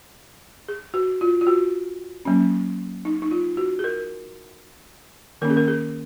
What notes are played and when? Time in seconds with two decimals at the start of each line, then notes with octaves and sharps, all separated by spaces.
0.69 G#4
0.94 F#4
1.21 F4
1.41 F4
1.47 F#4
2.25 F#3 A#3 C#4
3.05 D#4
3.22 D#4
3.31 F4
3.57 F#4
3.79 G#4
3.84 A#4
5.41 D#3 A#3 C#4 A#4
5.50 G#4
5.57 A#4
5.68 G#4